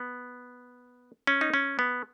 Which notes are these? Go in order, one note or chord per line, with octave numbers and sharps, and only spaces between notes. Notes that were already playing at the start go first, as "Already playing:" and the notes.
Already playing: B3
C#4
D#4
C#4
B3